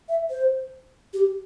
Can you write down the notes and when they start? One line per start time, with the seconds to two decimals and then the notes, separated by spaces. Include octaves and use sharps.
0.08 E5
0.30 C5
1.13 G4